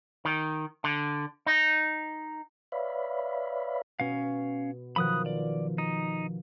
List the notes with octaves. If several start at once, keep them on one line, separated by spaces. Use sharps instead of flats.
D#3
D3
D#4
B4 C#5 D5 E5 F5 B5
B2 C#4 F5
B2 D#3 F3 B5 D#6 F#6
D5
D#4